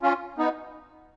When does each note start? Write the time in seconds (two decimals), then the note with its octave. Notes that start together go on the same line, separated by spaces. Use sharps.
0.03 C#4 F4
0.38 B3 D#4